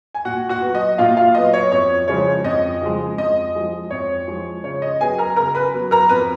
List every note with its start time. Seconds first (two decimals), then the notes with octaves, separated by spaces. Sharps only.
0.14 G#5
0.25 A#2 F#4 F#5
0.49 F#4 F#5
0.62 F#3 B3
0.75 D#5
0.98 A#2 F4 F5
1.17 F4 F5
1.35 F#3 B3 D#5
1.53 C#5
1.72 F2 C#5
2.08 C#3 F3 G#3 C#5
2.44 F2 D#5
2.81 C#3 F3 G#3
3.17 F2 D#5
3.55 F3 G#3
3.91 F2 C#5
4.27 F3 G#3
4.64 C#3 C#5
4.82 D#5
5.00 F#3 B3 G#4 G#5
5.18 A#4 A#5
5.36 C#3 A#4 A#5
5.55 B4 B5
5.74 F#3 B3
5.91 A#4 A#5
6.09 F2 B4 B5